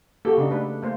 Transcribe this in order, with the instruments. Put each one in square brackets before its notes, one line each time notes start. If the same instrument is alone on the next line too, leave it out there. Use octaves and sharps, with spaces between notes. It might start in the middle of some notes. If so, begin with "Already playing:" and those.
[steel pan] A#3 F#4 [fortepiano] G4 A4
[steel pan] C#3 D4 D#4
A3 D4 B4
A3 A#3 C5